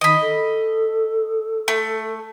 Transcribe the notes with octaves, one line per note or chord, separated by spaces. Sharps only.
D#3 D#5 B5
A4
A3